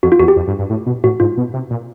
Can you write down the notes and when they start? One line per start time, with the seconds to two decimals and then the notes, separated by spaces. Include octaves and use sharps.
0.03 F2 F#4
0.12 F4
0.19 E2 F#4
0.28 G4
0.36 F2
0.47 G2
0.59 G2
0.70 A2
0.86 B2
1.04 A2 F#4
1.20 G#2 F4
1.37 B2
1.53 C3
1.70 A#2